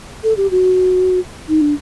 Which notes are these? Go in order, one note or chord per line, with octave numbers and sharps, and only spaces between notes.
A4
G4
F#4
D#4
D4